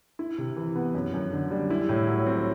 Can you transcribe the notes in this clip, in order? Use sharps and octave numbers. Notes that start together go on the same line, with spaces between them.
E4
C3
E3
B3
F#2
F#2
D3
G3
E4
A2
F#3
C4